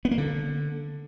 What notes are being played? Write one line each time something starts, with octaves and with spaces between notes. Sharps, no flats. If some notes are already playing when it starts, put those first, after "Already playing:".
B3
A#3
D3